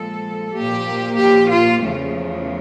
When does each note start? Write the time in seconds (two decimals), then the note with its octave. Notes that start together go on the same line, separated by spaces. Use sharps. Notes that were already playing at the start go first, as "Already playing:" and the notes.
Already playing: A#2 F3 G#3 A4
0.54 A#2 F3 A#3 G4
1.17 G4
1.49 F4
1.80 E2 C#3 F3 A3